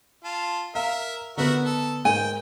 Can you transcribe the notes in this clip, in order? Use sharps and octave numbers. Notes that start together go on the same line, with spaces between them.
F4 A5
A#4 E5 F5
D3 B3 F#4 A#4 E5
A4
G#2 A#4 G5 G#5